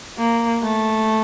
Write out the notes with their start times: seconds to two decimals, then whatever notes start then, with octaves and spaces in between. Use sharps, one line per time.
0.18 A#3
0.63 A3